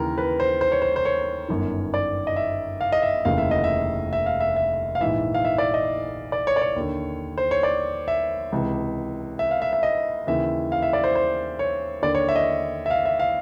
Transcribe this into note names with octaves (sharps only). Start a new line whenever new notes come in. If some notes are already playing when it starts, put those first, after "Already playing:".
Already playing: D#2 C#3 E3 A#4
B4
C5
C5
C#5
C5
C5
C#5
G1 F#2 D#3
D5
D#5
E5
F5
D#5
E5
F1 D#2 C#3 E3 F5
E5
D#5
E5
E5
F5
E5
E5
F5
A#1 G#2 E3 E5
F5
E5
D5
D#5
D5
C#5
D5
C#5
D#2 D3
C5
C#5
D5
E5
C#2 C3 E3
E5
F5
E5
E5
D#5
D#2 C#3 E3 E5
F5
E5
D5
C5
C5
C#5
D#2 D3 D5
C#5
E5
D#5
E5
F5
E5
F5